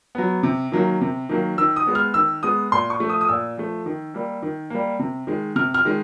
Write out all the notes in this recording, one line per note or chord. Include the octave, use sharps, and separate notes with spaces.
F#3 B3
C3
D#3 F#3 A#3
C3
D#3 F#3 A#3
D#3 E6
D#6
G#3 B3
F6
D#3 E6
G#3 B3 D#6
A#2 C6
C#6
F3 A3
D#6
D#6
A#2 E6
F3 A3
D#3
G3 A#3
D#3
G3 A#3
C3
D#3 G#3
C3 F6
F6
D#3 G#3